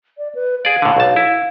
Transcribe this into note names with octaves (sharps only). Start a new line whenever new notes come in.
D5
B4
G#4 D5 F5
A2 D3
B1 A5
E4